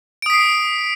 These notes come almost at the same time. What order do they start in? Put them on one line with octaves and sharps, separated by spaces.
D7 D#6 B6 C7